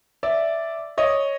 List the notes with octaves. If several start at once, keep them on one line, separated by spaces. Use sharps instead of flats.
D5 E5
C#5 D#5